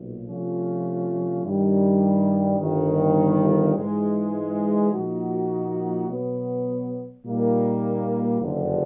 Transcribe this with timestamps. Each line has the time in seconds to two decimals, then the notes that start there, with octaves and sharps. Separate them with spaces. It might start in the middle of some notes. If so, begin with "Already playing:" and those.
Already playing: B1 A#2
0.28 C3 F3 A3 C#4 F4
1.44 G2 D#3 G3
2.59 G1 G2 D#3
3.76 G#2 E3 G#3
4.92 A#2 F3 A#3 D#4 F#4
6.08 B2 F#3 B3
7.24 A#2 G3 A#3 D#4
8.41 F#1 F2 D3